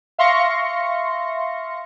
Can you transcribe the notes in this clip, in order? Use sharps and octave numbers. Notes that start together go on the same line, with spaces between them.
E5 F5 C6 C#6 A#6 C#7